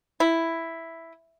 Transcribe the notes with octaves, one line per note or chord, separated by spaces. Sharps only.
E4